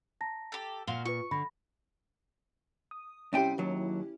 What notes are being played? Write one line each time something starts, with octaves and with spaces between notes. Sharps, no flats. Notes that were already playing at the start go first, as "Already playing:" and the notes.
A5 A#5 A#6
G4 A4
A#2 F#4 F5 C6 G7
F4 B4 C#6
D3 B5 A#6
D#6
C2 C3 C#4 E4 G4 G5
D#2 F#3